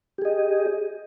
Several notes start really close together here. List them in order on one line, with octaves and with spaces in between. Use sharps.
G4 G#4 D#5